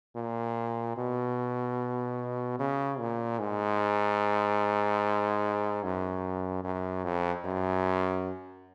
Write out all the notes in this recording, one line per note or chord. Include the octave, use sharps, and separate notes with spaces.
A#2
B2
C#3
A#2
G#2
F#2
F#2
F2
F#2